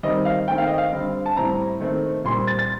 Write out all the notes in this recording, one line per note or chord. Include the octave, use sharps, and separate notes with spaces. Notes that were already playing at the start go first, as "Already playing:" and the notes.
D#3 G3 C4 D#5
F5
D#3 A3 C4 G5
F5
D#5
F5
D3 G3 C4
A5
A2 G3 C4 A#5
D#3 A3 C4
A#2 G3 C4 C6
A6
A6